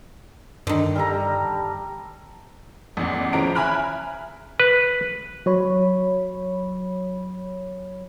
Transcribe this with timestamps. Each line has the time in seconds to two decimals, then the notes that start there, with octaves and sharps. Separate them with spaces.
0.67 G2 D3 D#3
0.96 G3 A4 A#5
2.97 A1 E2
3.33 C#3 E3 F3 C#4 A#5 D7
3.55 E5 G#5 A#5 B5 F6 F#6
4.60 B4
5.46 F#3 C#5 B5